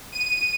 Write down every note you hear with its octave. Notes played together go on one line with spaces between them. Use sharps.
D#7